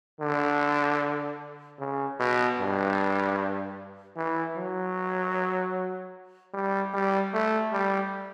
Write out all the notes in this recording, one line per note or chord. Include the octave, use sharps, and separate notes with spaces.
D3
C#3
B2
G2
E3
F#3
G3
G3
A3
G3